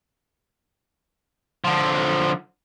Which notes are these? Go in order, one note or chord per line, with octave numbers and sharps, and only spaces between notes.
D3 F3